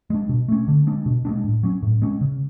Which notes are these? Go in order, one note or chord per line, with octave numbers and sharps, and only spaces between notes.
G#3 D4
B2
A3 C#4
D3
G#3 D4
B2
G#3 B3 D4
A2
F#3 C#4
A2
G#3 C#4
C#3